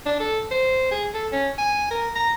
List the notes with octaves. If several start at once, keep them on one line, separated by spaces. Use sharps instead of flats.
D4
A4
C5
G#4
A4
C#4
G#5
A#4
A#5